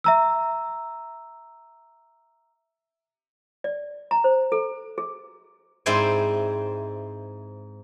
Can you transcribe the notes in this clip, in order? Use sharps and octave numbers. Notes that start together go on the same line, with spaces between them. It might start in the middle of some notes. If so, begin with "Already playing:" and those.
E5 A#5 E6
D5
A#5
C5
A4
G#4
G#2 C4 E4 C5 D5 G#5